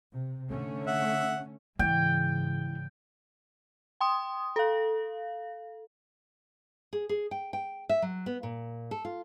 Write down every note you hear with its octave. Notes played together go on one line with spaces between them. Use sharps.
C3
D3 A3 C#4
E5 F#5
G#2 C#3 E3 G5
G5 C6 D#6
A4 F5
G#4
G#4
G5
G5
E5
F#3
B3
A#2
A4
F4